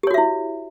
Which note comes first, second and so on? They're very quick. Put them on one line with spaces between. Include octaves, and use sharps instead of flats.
G4 C#5 F#4 E5 E4